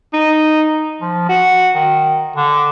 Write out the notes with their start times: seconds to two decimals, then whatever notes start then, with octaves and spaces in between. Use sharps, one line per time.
0.13 D#4
1.01 F3
1.29 F#4
1.74 D#3
2.36 D3